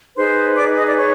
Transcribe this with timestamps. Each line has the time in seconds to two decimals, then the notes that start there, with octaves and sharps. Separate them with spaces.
0.16 D#4 G#4 B4 C5 C6
0.56 D5 D6
0.76 D#5 D#6
0.86 D5 D6
0.96 C#5 C#6